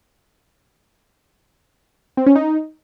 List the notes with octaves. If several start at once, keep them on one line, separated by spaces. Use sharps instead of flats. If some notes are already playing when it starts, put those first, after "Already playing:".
C4
C#4
D#4